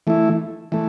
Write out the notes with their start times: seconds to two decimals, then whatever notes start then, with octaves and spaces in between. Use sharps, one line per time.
0.07 E3 A3 E4
0.72 E3 A3